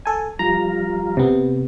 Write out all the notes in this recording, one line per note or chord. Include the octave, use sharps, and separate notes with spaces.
A4 G#5
F3 G3 F4 A#5
C3 B3